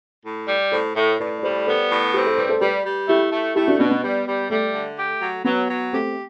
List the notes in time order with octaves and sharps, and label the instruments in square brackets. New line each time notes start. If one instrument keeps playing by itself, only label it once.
[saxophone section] A2
G3
[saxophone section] A2 [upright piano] A4 C5
[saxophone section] A2
[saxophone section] A2 [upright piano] B4 D5
[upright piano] D5
[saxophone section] G3 [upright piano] A4 C5
[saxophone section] B3 [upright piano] A4 C5
[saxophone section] A2
[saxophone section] C4 [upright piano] G4 B4
[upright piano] A4 C5
[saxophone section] G3 [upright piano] B4 D5
[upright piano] A4 C5
[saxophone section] G3 [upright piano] G4 B4
[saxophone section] G3
[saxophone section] A3 [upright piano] E4 G4
[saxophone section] A3
[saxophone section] A3 [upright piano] E4 G4
[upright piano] D4 F#4
[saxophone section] B2 [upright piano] B3 D4
[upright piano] B3
[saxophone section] G3
G3
[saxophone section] G3 [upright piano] A3
[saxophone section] D3
G4
F#3
[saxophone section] F#3 [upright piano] B3
[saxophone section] F#3
[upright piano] A3 C4 [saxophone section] G4